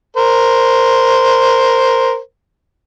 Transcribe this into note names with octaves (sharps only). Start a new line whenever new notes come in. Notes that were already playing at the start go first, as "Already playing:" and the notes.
A#4 C5